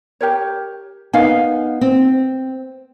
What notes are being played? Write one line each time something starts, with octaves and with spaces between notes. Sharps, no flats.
G4 A#4 C#5
B3 D#4 A#4 F5 G#5
C4